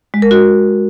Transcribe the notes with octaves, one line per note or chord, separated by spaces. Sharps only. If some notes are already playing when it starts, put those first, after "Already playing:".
G#3
A#4
F#4